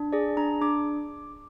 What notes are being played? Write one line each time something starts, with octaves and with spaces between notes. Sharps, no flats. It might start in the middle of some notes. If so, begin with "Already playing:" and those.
Already playing: D4
G#4 D5
D4 A#5
D4 D6